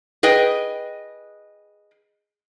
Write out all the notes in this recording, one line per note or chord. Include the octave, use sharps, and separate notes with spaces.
G#4 B4 D#5 G5